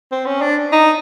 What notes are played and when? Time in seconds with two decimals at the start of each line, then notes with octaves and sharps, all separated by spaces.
0.12 C4
0.26 C#4
0.41 D4
0.72 D#4